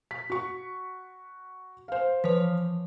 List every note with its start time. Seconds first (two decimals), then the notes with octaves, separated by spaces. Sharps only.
0.11 B6
0.30 F#4 C#6
1.88 C5 F5
2.24 E3 F3 B4 C#5